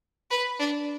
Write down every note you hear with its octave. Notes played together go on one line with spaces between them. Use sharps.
B4
D4